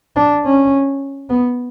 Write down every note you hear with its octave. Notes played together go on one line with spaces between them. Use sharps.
D4
C#4
B3